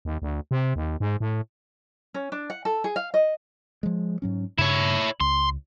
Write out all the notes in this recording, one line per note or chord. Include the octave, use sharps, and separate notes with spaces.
D#2
D2
C3
D#2
G#2
A2
C#4
D4
F#5
A4
G#4
F5
D#5
F3 G#3
G#2 F#3 C#4
G2 C#3 E4 C#5
C#2 C6